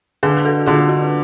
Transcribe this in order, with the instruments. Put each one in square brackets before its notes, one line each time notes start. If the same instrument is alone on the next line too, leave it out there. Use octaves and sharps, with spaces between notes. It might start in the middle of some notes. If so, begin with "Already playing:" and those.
[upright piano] D3 [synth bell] G#4 B4
[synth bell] F#4 A4
[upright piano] D3 [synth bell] F4 G#4
[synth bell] D4 F#4